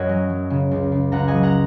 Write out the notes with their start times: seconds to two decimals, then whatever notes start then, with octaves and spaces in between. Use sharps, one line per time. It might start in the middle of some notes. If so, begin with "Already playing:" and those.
Already playing: F#2 A#4 C#5 D#5 F#5 G#5
0.09 F#3
0.30 F#3
0.50 C#3
0.71 C#2
0.92 C#2
1.12 C#2 F#5 A#5
1.28 D#5 G#5
1.34 F#3
1.43 F#5 A#5